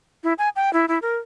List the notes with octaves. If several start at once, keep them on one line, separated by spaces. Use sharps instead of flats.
E4
G#5
G5
E4
E4
A#4